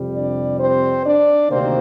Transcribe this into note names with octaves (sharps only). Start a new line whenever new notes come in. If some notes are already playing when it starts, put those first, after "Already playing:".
Already playing: F2 C3 G3
D4 D5
C4 C5
D4 D5
D2 C3 D#3 A#3 C4 C5